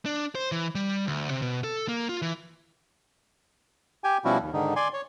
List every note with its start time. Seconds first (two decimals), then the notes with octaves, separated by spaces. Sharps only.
0.06 D4
0.35 C5
0.52 E3
0.75 G3
1.07 D2
1.30 C3
1.42 B2
1.64 A4
1.88 A#3
2.09 F4
2.22 E3
4.04 G4 G5 G#5
4.25 B2 F3 G3 C#4 E4 F#4
4.41 D#2
4.53 G#2 D3 D#3 D#4
4.76 D5 G#5 C6
4.94 C#5